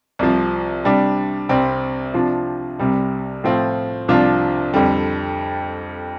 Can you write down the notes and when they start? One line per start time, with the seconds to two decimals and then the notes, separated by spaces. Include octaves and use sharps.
0.19 C2 C3 F3
0.85 C3 G3 D4
1.49 C2 C3 G3 C4
2.14 C3 F3 D4 F4
2.79 C2 C3 G3
3.44 A2 F3 C4 F4
4.08 C2 C3 F3 D4 F4
4.74 F2 D3 G3